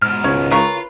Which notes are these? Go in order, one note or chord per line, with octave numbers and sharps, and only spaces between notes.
G#2 B2 F6
C#2 C#5
C#3 F4 A#4 B4 C#6